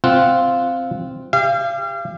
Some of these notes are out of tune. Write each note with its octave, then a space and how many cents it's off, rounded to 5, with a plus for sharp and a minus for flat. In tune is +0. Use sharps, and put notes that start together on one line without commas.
C4 +0 F4 +0 F#5 +0
G4 +25 F5 -35